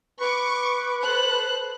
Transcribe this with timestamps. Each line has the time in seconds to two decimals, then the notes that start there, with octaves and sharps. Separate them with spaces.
0.20 B4 C#6 D6
1.02 A4 C5 F#6